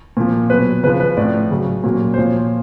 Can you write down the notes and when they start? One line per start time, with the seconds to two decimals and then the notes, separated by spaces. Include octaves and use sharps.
0.17 A#2 F3
0.50 B2 F#3 B4
0.83 C#3 B4
0.87 F3
1.00 B4
1.17 A2 F3 D5
1.50 C#3 F#3
1.84 A#2 F#3
2.14 C5
2.18 A#2 F3 C#5